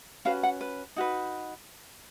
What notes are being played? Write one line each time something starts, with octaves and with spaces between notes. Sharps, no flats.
C#4 F#4 B4 F5
F#5
B4
D#4 F#4 B4